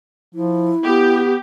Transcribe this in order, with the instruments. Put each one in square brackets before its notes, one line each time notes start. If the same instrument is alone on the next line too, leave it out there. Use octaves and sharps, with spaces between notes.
[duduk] F3 [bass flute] E4
[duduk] B3 [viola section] G4